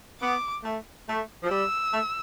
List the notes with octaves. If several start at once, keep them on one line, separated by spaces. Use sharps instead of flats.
B3 D6
A3
A3
F3
G3 E6
A3